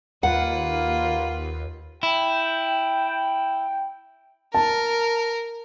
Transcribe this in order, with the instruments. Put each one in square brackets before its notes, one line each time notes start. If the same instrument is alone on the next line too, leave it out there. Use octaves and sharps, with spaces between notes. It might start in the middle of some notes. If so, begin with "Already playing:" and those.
[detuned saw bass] D#2 [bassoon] A#3 [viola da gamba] F4 B4 [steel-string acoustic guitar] F#5
[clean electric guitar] E4 [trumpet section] G5
[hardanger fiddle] A#4 [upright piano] A5